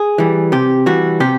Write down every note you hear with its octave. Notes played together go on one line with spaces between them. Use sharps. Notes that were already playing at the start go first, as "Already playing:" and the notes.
Already playing: G#4
E3 G3
C3 G4
E3 G3 F#4
C3 G4